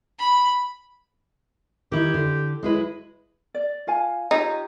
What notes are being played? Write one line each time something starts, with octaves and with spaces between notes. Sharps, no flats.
B5
D#3 E4 G4
D3
F#3 G#3 E4 B4
D5
F4 F5 G#5
D#4 F4 G4 C#5